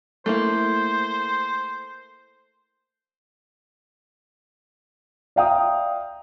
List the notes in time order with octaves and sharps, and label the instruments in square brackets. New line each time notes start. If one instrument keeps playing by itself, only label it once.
[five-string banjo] A3 A#3 E4 [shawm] C5
[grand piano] D5 E5 F5 G5 A#5 D#6